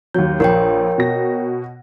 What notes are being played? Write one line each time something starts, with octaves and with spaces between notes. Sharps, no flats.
D#2 F#3 G6
A#1 A#4 C#5 G5
B2 A#6